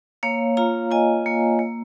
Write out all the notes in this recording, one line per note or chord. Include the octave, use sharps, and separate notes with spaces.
A#3 C#5 F5
F4 F5 A#5
F4 D#5 G#5
A#3
A#3